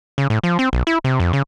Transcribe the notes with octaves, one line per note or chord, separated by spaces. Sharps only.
C#3
A2
F3
C4
B1
E4
C3
F2
C#3